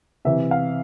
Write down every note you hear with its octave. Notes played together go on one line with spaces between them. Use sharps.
C3 E3 E5
F5